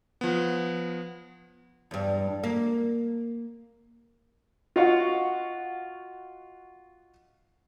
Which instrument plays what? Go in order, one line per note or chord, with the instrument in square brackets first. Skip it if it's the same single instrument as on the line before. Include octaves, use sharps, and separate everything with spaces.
[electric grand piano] F3 B3
[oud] E2 G2
A#3
[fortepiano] F4 F#4 D#5 F5 F#5 C#6